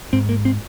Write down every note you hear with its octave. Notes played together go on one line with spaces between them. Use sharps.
G#2 C4
A#3
C4